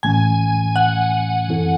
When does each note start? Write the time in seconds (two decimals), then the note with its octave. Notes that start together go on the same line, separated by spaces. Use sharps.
0.03 A1 A2 E3 A3 C#4 G#5
0.76 F#5
1.48 F#2 E3 C4 E4 A4